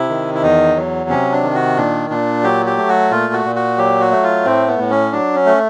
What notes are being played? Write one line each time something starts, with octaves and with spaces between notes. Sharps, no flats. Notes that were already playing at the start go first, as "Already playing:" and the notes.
Already playing: C3 E4
D#3
E4
E2 D#4
F#3
C3 C#4
D4
D#3
F#4
A#2 D4
A#2 D4
F#3 G4
G4
A3
F#4
A#2 F4
F#4
A#2
F#4
F#3 G4
F#4
A3
F4
A2 C4
B3
A2
C#4
F#3 D4
C#4
A3